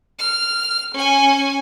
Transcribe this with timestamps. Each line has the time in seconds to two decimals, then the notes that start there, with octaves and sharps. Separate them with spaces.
0.19 F6
0.94 C#4 G#5